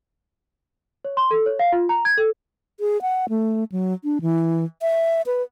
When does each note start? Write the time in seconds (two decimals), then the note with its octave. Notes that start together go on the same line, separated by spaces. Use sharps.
1.05 C#5
1.17 C6
1.31 A4
1.46 C#5
1.59 F5
1.72 F4
1.89 A#5
2.05 G#6
2.18 A4
2.80 G#4
3.02 F#5
3.29 A3
3.72 F#3
4.04 D4
4.22 E3
4.82 E5
5.26 B4